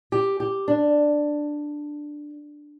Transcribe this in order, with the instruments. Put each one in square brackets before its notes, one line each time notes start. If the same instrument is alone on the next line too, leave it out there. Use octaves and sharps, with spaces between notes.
[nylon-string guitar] G4
G4
D4